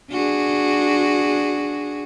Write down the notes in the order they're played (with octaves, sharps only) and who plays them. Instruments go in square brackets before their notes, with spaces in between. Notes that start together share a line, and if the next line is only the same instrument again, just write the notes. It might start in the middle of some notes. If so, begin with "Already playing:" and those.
[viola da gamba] D4 F#4 G#4